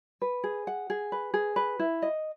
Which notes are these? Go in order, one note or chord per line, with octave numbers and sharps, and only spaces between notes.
B4
G#4
F#5
G#4
B4
G#4
B4
E4
D#5